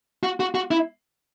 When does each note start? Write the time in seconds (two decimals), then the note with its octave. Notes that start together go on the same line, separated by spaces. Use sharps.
0.23 F#4
0.40 F#4
0.55 F#4
0.71 E4